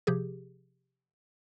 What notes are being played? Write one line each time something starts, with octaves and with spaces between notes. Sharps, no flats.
C3 F3 G4 G#4